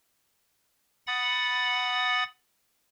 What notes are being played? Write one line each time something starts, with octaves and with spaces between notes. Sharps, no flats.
F#5 B5 D#6 A6